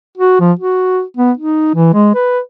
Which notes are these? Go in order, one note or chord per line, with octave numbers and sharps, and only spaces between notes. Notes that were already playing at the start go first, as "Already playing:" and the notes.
F#4
F3
F#4
B3
D#4
E3
G#3
B4